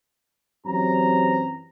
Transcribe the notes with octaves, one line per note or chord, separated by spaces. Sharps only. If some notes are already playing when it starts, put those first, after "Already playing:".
F#2 E3 C4 G4 A#5